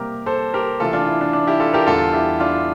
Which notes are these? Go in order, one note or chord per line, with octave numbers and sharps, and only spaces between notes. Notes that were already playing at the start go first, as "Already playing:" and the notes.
Already playing: C3 G3 A#3 G4 A#4
A4 C5
G4 A#4
C3 E3 A3 F4 A4
D4 F4
E4
D4
D4
E4 G4
F4 A4
G4 A#4
E2 D3 G3 F4 A4
E4 G4
D4 F4